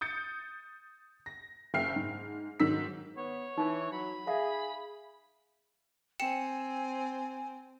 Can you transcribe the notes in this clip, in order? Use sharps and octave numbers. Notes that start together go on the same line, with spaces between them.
D#6 G6 A6 C#7
A#6
F#1 E5 G5 F6 C7
G#2
G#2 D#3 F#3 E6 B6
B3 C#5
E3 D#4
F#3 B5
G#4 E5 F5
C4 G5 G#5 C#7 E7